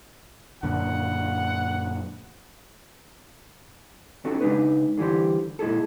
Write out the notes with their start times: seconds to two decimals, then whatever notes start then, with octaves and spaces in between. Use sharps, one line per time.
0.63 F#2 A#2 D3 F#5
4.25 C4 C#4 D#4 F#4 A4
4.41 C#3 G#3 A3 D4 D#4 B4
4.98 D3 E3 G3 G4 C5
5.59 A#2 G#3 E4 G#4 A4